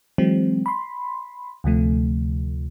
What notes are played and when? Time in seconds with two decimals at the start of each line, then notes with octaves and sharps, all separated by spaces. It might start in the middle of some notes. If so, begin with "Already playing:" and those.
0.18 E3 F#3 G#3 C4
0.66 B5 C6
1.64 D2 C3 F3 A3